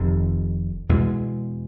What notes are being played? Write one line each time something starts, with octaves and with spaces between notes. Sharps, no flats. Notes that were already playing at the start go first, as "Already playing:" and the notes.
Already playing: F1 F2 C3 D#3
E2 B2 G#3